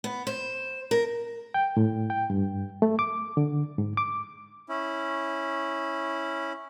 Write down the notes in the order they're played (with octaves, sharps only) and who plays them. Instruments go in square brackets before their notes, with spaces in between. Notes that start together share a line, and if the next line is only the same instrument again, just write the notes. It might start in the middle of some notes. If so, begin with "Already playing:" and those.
[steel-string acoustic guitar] B3
C5
A#4
[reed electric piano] G5
A2
G5
G2
A3
D6
D3
G#2
D6
[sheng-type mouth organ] C#4 E4